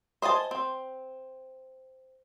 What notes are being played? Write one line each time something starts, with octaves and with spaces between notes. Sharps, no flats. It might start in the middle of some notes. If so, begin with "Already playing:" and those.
C5 D#5 G#5 A5
C4